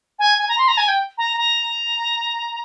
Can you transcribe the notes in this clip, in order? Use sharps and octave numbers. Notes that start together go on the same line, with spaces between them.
G#5
G#5
A#5
C6
A#5
G#5
G5
A#5
A#5